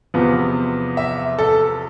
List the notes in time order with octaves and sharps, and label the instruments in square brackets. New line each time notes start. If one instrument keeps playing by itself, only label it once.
[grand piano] E2 C3 F3 B3
E5
A4